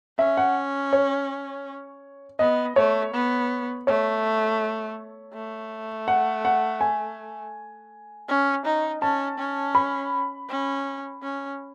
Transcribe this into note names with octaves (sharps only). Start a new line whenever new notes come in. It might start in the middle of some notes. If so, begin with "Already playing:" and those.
C#4 E5
F#5
C#5
B3 D#5
A3 C#5
B3
A3 C#5
A3
F#5
F#5
G#5
C#4
D#4
C#4 A5
C#4
B5
C#4
C#4